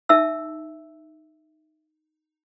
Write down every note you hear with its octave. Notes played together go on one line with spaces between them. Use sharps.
D#4 E5 A5 E6